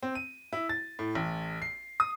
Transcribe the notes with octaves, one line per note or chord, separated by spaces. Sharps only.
C4
D#7
E4
A6
A2
A1
C7
D#6